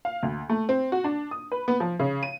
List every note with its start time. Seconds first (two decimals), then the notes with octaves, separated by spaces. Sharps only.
0.05 F5
0.23 D2
0.49 A3
0.69 C4
0.92 F#4
1.04 D4
1.31 D#6
1.52 B4
1.68 B3
1.80 F3
1.99 C#3
2.23 D#7